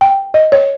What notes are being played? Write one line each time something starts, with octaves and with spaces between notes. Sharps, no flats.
G5
D#5
C#5